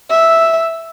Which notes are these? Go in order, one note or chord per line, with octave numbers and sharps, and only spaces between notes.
E5